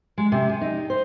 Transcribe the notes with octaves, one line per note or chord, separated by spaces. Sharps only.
G#3
C3
G#4
D#4
C5